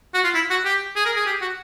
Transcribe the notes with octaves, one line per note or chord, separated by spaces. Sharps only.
F#4
F4
E4
F#4
G4
G#4
A#4
G#4
G4
F#4